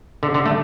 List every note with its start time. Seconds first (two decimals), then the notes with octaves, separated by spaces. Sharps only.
0.23 D3
0.34 D3
0.46 A3